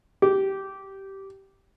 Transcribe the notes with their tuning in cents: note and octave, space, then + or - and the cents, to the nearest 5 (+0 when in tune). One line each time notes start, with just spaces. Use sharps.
G4 -15